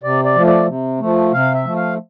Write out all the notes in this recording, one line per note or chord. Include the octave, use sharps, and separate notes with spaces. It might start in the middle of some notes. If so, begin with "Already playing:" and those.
C3 D5
D5
F3 A3
D5
C3
F3 A3
C3 F5
E5
F3 A3
F5